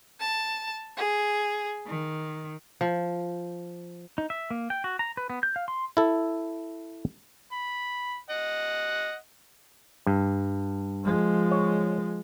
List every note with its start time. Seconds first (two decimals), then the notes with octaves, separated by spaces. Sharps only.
0.19 A5
0.95 G#4
1.86 D#3
2.81 F3
4.18 D#4
4.30 E5
4.50 A#3
4.70 G5
4.84 F#4
4.99 A#5
5.17 B4
5.30 B3
5.43 G6
5.56 F5
5.68 C6
5.97 E4 A4
7.52 B5
8.30 D#5 F#5
10.06 G2
11.04 F3 G#3
11.51 C#5